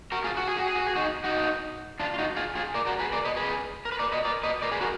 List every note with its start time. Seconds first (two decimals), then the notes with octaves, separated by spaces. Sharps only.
0.12 F#4 A#4
0.24 F4 G#4
0.37 F#4
0.48 G#4
0.57 F#4
0.67 G#4
0.76 F#4
0.87 G#4
0.95 D#4 F#4
1.24 D#4 F#4
2.00 D4 F4
2.14 F4
2.18 D#4 F#4
2.36 F4 G#4
2.55 F4 G#4
2.74 A#4 D5
2.87 F#4 A#4
2.99 G#4 B4
3.12 A#4 D5
3.25 B4 D#5
3.37 G#4 B4
3.85 A#4
3.92 B4
3.99 A#4 D5
4.12 B4 D#5
4.25 A#4 D5
4.43 B4 D#5
4.62 A#4 D5
4.72 G#4 B4
4.81 F#4 A#4